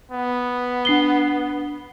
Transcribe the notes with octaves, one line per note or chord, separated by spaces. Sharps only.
B3
D4 C7 G7